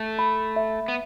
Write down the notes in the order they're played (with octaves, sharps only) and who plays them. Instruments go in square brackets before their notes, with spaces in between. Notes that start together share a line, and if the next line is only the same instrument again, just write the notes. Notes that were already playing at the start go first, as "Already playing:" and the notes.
Already playing: [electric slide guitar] A3
[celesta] B5
E5
[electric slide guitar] B3